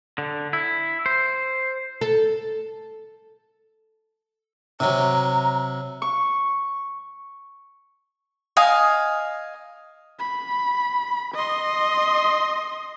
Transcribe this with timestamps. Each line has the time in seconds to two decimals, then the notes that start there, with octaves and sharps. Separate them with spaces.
0.18 D3
0.53 E4
1.06 C5
2.01 A4
4.80 C3 F#3 A#5
6.02 C#6
8.57 D#5 F5 G#5
10.19 B5
11.34 D#5 C6